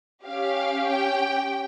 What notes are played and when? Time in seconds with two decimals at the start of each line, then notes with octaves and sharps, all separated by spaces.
0.25 C#4 G4 F5
0.88 G5